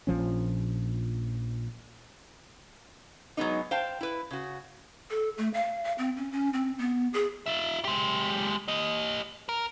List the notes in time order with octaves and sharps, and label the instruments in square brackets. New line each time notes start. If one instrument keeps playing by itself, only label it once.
[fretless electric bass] A#1 A#2 F3 C#4
[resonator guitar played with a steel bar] F#3 G#3 B3 D#4
C5 F5 G5 A5
E4 B4
C#3 F#4
[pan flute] A4
A3
F5
F5
C4
C#4
C#4
C4
B3
G#4
[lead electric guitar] F4 E5
G#3 G4
G4 D#5
A#4